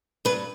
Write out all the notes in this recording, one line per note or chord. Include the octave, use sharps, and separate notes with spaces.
G2 B4